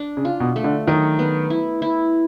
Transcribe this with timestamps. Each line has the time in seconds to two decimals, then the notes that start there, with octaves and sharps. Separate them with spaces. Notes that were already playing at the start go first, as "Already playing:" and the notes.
Already playing: D4
0.17 C#3
0.25 F4
0.40 B2
0.56 A3
0.64 D3
0.87 D#3 F#3
1.19 B3
1.50 E4
1.82 E4